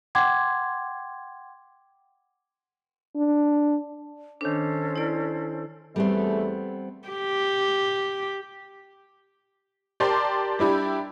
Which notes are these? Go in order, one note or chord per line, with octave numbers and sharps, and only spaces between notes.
F#5 G5 C6 D6 G#6
D4
D#3 C#4 D4 A4 C5
E4 D5
E2 G3 A3 B3 C4
G4
G4 A#4 D5 A5 C6 D6
G3 D4 E4 G4